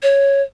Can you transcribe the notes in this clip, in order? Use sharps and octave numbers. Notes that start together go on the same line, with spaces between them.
C#5